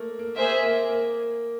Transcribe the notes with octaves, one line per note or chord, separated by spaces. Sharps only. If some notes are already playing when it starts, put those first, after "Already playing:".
Already playing: A3 A#3
A#3
A#3 G#4 C5 E5
A#3
A#3